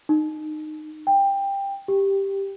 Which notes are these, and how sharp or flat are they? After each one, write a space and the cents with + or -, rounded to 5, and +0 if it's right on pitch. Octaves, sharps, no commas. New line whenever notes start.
D#4 -20
G5 +15
G4 +0